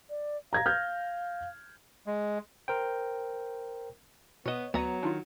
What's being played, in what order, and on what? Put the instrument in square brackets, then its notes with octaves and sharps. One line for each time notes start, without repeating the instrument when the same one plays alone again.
[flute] D5
[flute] F5 [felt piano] A#5 G#6 A#6
[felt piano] F6 G6 G#6
[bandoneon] G#3
[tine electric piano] A#4 C5 G5
[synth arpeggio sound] B2 F#6 E7 [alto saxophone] B3 [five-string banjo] C#5 D#5
[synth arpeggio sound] D2 D5 D#7 [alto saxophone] F#3 [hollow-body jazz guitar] B3 [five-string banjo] C#5 A#5
[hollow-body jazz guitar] D#3 [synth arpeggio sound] D4 E4 F4